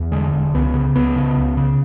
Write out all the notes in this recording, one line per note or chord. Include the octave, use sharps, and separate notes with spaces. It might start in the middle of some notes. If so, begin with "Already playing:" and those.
Already playing: E2
D3 G#3
E1
C#2 B3
C#3
C#2 B3
C#3
C#2
C#3